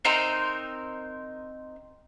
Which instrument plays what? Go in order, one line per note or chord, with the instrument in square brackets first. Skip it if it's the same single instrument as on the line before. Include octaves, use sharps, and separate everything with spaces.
[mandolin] C4 D#4 A#4 C5